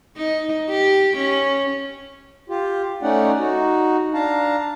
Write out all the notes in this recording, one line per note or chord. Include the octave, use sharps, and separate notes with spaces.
D#4
G4
C#4
F4 G4
A3 C#4 D#4 D5 F#5
D#4 F#4
D4 F5 A5 A#5